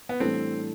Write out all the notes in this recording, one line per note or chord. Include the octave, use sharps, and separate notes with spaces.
B3
A2 E3 G3 C4 D4 A4